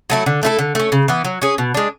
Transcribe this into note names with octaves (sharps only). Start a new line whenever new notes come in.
F#3 A3 E4
D3
A3 E4 A4
D3
A3 C#4
C#3
E3 B3
F#3
C#4 G#4
B2
G#3 D4